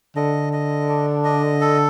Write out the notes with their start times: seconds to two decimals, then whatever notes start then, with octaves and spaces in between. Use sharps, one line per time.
0.16 D3 D#5
0.53 D#5
0.89 D4
1.25 D#5
1.61 A4